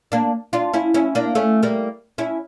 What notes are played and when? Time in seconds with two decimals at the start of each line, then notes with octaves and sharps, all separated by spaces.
0.12 A#3 D4
0.53 D4 F4
0.74 C#4 E4
0.94 C#4 E4
1.15 A#3 D4
1.35 A3 C#4
1.63 G3 A#3
2.18 C#4 E4